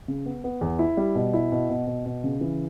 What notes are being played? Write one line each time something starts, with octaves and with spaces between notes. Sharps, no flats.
C#3
B3
B3
E2
E4
G3
B2
E4
B2
B2
B2
B2
C#3
E3